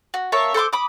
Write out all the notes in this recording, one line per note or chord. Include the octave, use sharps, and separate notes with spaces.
F#4
A#3 C#5 E5 A5
A4 C5 C6 D6
B5 D6 D#6